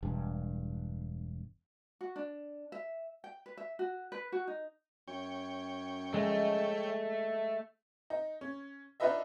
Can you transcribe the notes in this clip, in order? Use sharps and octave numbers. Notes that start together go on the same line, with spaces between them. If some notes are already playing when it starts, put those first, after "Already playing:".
E1 G2
F#4
D4
E5
G5
B4
E5
F#4
B4
F#4
D#4
F#2 C#5 G5
G#3 A3
D#4
C#4
D4 D#4 F4 B4 D#5 E5